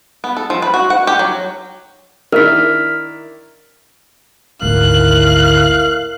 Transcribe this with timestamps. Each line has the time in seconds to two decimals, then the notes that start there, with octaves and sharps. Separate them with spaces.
0.24 B3
0.37 A4
0.50 F3
0.62 B4
0.74 F#4
0.90 F#5
1.07 G4
1.19 F#3
2.32 D#3 D4 E4 A#4 F6 B6
4.61 G#1 D2 A3 E4 A#4 F5 F#6